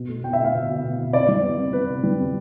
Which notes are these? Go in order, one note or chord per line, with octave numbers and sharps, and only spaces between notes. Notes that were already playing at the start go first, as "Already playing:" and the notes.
Already playing: B2
A3
B2 G5
E5
A3 F5
B2
B2
B2
B2
C3 D5
G3
B3
C3
C3 B4
C3
G3
C3